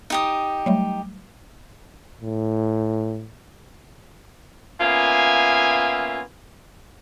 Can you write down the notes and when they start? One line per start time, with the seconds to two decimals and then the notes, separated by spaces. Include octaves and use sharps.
0.10 D#4 G4 D#6
0.66 F#3 G3 A3
2.21 A2
4.81 A#3 B3 C#4 F4 E5 G#5